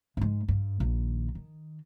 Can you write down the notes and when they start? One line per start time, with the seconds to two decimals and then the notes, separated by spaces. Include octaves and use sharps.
0.17 G#2 G#3
0.48 G2
0.80 A#1 D#3
1.35 D#3